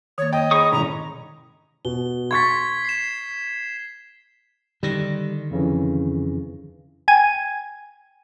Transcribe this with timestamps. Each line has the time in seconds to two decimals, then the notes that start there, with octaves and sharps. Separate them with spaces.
0.18 D#3 A#3 C#5
0.33 D#5 G5
0.51 D#4 G#4 C#5 B5 C#6 D#6
0.72 A1 G#2 B2 D#3 C#4 A#5
1.85 B2 G7
2.31 C6 C#6 G#6 A6 B6
2.85 C7 E7
4.83 D3 D#3 G3 A#6
5.51 F2 C#3 E3
7.08 G5 G#5 G#6 D#7